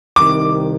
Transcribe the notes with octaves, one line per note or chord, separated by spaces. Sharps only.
C2 C3 D#3 D6